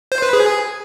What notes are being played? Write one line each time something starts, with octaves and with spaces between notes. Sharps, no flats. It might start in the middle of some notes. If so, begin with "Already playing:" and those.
C5
B4
G#4